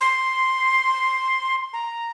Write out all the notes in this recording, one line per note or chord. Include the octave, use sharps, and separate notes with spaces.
C6
A#5